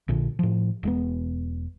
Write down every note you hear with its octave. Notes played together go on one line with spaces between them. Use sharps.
A#1 A#2 D3
A2 F3
E1 G#3 B3